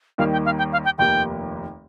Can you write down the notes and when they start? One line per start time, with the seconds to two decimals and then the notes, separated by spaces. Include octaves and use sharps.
0.18 D#2 D#3 G3 A#3 F5
0.32 G5
0.45 F5
0.58 G5
0.72 F5
0.85 G5
0.98 F1 D#2 D#3 A#3 G4 G5